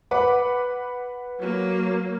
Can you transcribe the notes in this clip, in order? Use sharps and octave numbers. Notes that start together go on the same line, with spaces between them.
B4 F#5 D6
F#3 A#3